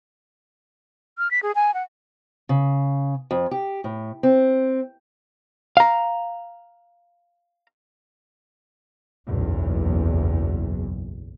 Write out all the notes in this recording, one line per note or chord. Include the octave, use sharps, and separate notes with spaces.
F6
B6
G#4
G#5
F#5
C#3
F2
G4
A2
C4
F5 A#5
F#1 B1 E2